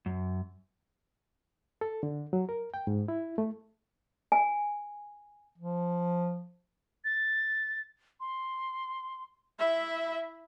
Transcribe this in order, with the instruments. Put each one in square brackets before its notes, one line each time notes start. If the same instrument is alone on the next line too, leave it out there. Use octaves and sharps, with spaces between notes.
[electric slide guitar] F#2
[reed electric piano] A4
D3
F#3
A#4
G5
G#2
E4
A3
[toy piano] G#5
[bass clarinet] F3
[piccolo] A6
C6
[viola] E4 E5